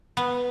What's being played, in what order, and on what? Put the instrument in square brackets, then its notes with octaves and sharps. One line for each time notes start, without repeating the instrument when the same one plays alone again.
[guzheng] B3